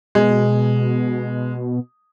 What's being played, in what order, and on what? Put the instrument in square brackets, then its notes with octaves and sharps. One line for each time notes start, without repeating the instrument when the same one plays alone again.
[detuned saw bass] B2 [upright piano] G#3